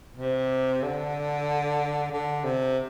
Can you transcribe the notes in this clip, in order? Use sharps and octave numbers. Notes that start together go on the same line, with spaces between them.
C3
D3
D3
C3